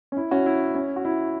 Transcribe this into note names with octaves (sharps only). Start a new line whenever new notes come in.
C#4
E4
C#4 F#4
E4
C#4
F#4
E4